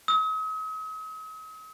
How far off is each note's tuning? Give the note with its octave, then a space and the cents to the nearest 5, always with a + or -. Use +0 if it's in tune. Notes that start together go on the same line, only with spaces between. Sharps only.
D#6 +45